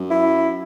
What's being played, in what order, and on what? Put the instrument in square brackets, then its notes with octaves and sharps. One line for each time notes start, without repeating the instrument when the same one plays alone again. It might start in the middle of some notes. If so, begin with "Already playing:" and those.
Already playing: [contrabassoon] F#2
[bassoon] E4